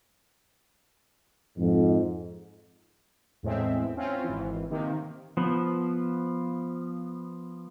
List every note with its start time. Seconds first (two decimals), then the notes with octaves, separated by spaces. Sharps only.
1.57 F2 G#2
3.43 E2 A2 G#3 C4 E5
3.97 C4 C#4 F4
4.24 G#1 E3
4.70 C3 D#3 A#3
5.37 F3 B3